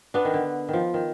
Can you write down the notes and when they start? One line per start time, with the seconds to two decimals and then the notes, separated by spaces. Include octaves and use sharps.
0.14 B3 D4
0.25 D#3
0.34 D3
0.69 D#3 F3
0.94 D#3